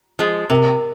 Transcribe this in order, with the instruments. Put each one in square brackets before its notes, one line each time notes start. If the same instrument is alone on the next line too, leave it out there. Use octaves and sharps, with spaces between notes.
[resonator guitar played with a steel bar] F3 G#3
[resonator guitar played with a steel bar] C3 [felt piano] A#4